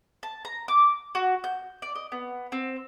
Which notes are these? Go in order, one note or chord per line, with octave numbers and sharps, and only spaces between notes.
A5
A#5
D6
F#4
G6
D5
D#5
B3
C4